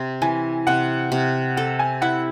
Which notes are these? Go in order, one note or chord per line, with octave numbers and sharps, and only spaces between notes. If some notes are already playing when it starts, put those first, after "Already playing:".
Already playing: C3
E3 G#5
C3 F#5
C3
A4 F#5
G#5
E4 F#5